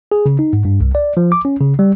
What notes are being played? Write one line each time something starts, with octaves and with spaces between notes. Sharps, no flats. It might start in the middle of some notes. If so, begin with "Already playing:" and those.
G#4
C#3
D#4
G#2
G2
C2
D5
F3
D6
C#4
C#3
G3